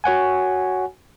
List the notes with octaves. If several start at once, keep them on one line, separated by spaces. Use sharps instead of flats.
F#4 C#5 F#5 G#5